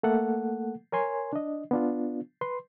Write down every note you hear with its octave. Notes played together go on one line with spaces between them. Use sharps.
A3 A#3 A4 F#5
A#4 C#5 G#5 C6
D4 D#5
B3 D4 F4
B4 C6